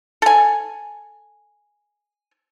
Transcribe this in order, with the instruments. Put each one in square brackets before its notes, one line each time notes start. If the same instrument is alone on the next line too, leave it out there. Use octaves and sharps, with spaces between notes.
[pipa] A4 G#5